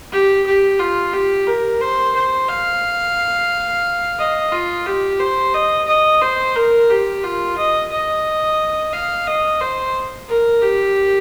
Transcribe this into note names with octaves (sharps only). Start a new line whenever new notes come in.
G4
G4
F4
G4
A#4
C5
C5
F5
D#5
F4
G4
C5
D#5
D#5
C5
A#4
G4
F4
D#5
D#5
F5
D#5
C5
A#4
G4